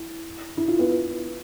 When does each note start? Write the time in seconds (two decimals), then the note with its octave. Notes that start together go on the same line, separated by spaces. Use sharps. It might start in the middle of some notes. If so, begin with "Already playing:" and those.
Already playing: E4
0.57 E4
0.68 F4
0.79 B3